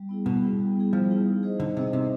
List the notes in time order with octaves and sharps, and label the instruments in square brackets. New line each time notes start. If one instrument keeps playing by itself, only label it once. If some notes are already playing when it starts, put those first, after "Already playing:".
Already playing: [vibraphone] G3
B3 E4 G#4
[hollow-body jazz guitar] B2 [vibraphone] G3
[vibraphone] B3 E4 G#4
G3
B3 E4 G#4
[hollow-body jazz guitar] F3 [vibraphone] G3
[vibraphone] B3 E4 G#4
D#4
G#4 C5 D#5
[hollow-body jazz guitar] D3 [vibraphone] D#4
[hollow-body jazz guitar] C3 [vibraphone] G#4 C5 D#5
[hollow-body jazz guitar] C3 [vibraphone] D#4